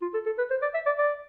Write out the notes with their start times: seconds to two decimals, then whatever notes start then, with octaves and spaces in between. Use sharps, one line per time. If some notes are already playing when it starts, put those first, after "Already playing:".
0.02 F4
0.14 A4
0.26 A4
0.38 B4
0.50 C5
0.62 D5
0.74 E5
0.86 D5
0.98 D5